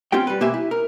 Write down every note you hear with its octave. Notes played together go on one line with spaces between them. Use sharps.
C4 C#4 F4 G4 G5
G3 B4
B2 A#3 G4 C5 E5 G#5
E4
A#4